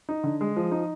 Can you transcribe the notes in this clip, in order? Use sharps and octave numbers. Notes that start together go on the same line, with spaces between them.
D#4
D3
G#3
F3
D#4